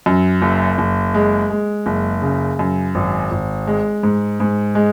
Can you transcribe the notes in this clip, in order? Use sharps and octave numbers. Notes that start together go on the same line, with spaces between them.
F#2
F#1
F#1
G#3
G#3
F#1
C#3
F#2
G#1
G#1
G#3
G#2
G#2
G#3